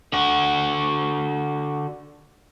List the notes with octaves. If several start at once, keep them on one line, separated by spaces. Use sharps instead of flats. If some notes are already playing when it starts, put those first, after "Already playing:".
D3 F#4